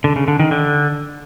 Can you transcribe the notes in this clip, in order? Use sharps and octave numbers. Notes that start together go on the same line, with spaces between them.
D3
C#3
D3
D#3
D3